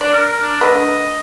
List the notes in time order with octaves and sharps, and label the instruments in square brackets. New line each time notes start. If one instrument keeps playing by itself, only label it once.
[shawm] D4 [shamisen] D5
[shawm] A#4
D4
[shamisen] D3 A3 B4 [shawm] D#5